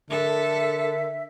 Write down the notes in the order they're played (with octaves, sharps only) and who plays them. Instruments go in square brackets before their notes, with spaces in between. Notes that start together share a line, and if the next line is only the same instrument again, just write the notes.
[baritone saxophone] D3 [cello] A4 [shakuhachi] A#4 [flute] E5